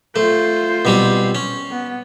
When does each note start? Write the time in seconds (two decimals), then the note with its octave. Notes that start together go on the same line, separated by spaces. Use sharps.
0.16 A3 F4 C5
0.85 B2 G3 C4
1.35 C#4
1.71 B3